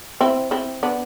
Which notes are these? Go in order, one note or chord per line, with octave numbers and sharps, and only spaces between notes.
C4 E4
C4 E4
B3 D4